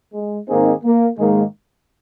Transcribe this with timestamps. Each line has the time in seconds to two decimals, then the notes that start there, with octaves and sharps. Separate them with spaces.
0.13 G#3
0.48 G#2 D#3 A#3 C4 D#4 G#4
0.83 A#3
1.18 G#2 D#3 G#3 A#3